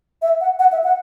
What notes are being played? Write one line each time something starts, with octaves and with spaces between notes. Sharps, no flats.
E5
F#5
F#5
E5
F#5